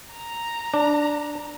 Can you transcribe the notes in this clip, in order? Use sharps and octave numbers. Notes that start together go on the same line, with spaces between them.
A#5
D4